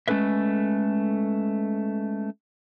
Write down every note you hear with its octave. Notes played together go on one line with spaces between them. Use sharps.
G#3 A3 C#4 A4 B4 E5